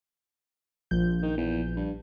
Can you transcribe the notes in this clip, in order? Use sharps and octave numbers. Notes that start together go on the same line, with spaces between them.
A#1 F3 G6
D#3
E2
G2